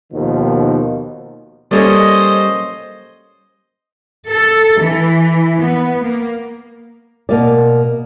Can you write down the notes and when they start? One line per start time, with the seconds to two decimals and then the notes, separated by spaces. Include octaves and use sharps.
0.13 D#2 B2 D#3 F3
1.71 G3 A#3 C#4 A4 C5 D5 D#5
4.29 A4
4.81 E3
5.59 B3
6.04 A#3
7.29 B2 A#3 D5